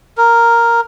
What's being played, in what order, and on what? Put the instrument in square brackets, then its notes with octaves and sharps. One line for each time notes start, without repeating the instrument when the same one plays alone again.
[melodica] A#4